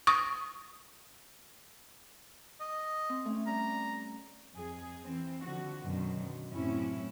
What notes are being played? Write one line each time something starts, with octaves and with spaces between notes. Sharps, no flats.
C#6 D#6
D#5
C4
A3 C#4
G3 A#5
F2 G#4
E3 C4
D3 F3 F#4
F#2 B2 D3 D#3
F#2 A2 C3 C#4 E4